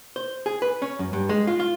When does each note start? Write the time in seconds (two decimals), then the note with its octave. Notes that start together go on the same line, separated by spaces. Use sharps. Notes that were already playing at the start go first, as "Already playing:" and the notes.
0.16 C5
0.46 G#4
0.62 B4
0.82 C#4
0.99 F#2
1.13 G2
1.29 G#3
1.47 F4
1.60 F4